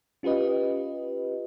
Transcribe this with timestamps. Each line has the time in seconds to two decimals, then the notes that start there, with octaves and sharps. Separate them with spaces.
0.23 C#4 F4 G4 B4 D#5